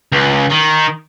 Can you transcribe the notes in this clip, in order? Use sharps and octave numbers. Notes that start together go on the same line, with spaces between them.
C#2
D#3